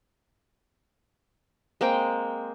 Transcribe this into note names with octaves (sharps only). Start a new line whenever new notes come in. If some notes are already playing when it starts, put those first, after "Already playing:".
G#3 A#3 C4 G5